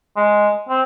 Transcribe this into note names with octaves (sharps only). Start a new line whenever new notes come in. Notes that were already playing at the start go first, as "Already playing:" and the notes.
G#3
C4